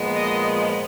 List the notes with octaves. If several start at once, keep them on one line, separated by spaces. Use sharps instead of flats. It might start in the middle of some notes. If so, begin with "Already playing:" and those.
Already playing: A#2 F3 G#3 B3
D#5